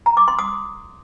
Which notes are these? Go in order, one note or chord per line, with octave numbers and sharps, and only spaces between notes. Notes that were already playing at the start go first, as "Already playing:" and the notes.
A#5
D6
C6
D#6